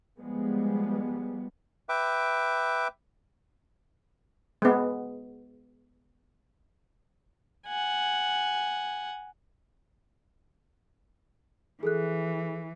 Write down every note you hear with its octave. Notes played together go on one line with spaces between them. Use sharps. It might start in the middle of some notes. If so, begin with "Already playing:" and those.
F3 G3 G#3 B3
B4 E5 G5 D6
G#3 B3
F#5 G#5
E3 G#4 A4 F#6